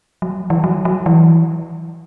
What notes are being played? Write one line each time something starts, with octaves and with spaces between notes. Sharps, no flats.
F#3
E3
F#3
F#3
E3